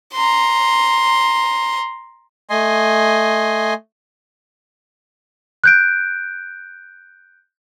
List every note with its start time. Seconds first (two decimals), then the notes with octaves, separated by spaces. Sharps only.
0.13 A#5 C6
2.50 A3 D#5 G#5 C6
5.64 F#6 G6 D7